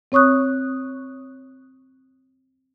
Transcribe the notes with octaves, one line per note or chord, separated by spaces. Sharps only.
C4 C#5 C#6 D#6 F#6